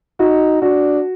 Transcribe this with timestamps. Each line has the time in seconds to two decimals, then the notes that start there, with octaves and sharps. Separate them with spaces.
0.19 D#4 F#4
0.62 D4 F#4